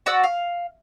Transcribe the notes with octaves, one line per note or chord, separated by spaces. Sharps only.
F#4 D5 F#5 E6
F5